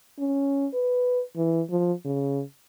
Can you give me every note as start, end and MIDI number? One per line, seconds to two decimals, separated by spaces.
0.19 0.67 61
0.74 1.22 71
1.36 1.61 52
1.70 1.92 53
2.05 2.42 49